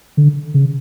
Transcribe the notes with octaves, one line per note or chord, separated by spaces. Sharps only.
D3
C#3